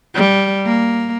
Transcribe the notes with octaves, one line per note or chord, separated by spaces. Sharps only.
G3
A#3